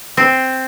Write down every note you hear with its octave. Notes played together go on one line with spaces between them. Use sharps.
C4